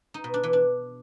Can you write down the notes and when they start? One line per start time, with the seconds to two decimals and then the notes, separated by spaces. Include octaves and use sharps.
0.14 D#4
0.24 B2
0.34 D4
0.43 E3
0.53 D4